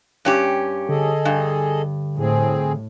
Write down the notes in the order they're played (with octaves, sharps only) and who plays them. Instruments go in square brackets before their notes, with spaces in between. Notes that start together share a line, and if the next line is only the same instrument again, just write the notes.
[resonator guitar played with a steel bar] G2 C#4 G4
[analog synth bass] D3 [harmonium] G#4 A4 D#5
[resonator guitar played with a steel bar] G2
[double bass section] A2 [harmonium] C4 G#4